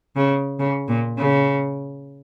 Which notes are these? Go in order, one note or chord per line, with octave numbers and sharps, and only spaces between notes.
C#3
C#3
A#2
C#3